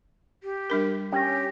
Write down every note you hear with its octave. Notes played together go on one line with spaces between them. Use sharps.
G4
G3 D4 A#4
C#4 G4 G5 A#6